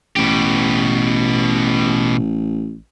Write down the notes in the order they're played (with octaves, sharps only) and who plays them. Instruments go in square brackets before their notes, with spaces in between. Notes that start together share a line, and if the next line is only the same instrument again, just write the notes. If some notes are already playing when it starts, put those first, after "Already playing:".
[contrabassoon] A1 [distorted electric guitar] B2 G4